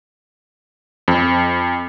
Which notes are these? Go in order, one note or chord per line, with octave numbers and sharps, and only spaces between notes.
F2